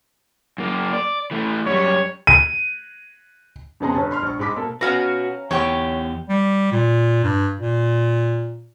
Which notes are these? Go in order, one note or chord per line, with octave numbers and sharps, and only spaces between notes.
F#2 A#3
D5
E3 A3
F#2 G3 C#5
D#7
F2 C#3 B3 G#4 A#5 C6
G1 B4 C#5 A5
B5 C6 F6
A#1 C#6
G#2 G#3 B5 D6 B6
B2 A#3 A4
C#4 F#4 B4 F5 A#5
E2 G4 C#5 G5 C#6
G3
A#2
G2
A#2